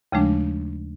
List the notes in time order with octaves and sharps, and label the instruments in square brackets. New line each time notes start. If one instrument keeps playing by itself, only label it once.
[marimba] D#2 C#3 F3 G#3 A3 D4